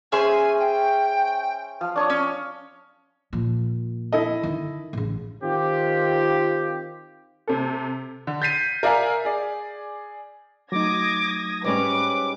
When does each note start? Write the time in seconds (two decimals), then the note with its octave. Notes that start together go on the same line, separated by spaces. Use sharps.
0.12 C#4 G#4 C5 E5 G#5 C6
0.59 G5
1.81 F3 F6
1.96 D4 C#5 C#6 D#6
2.10 C#4 F6
3.33 A#2 F3
4.12 E4 A4 D#5
4.43 D3 D#3
4.93 A1 C#3
5.42 D#3 C4 F4 G4
7.48 C3 A4
8.27 D3
8.42 G6 A6 B6 C7 D#7
8.83 A#4 D5 E5 F5 G#5 A#5
9.25 G#4 D5
10.72 F#3 A3 D#4 D6 D#6 G#6 A#6
11.64 G#2 G3 C#4 B4 D6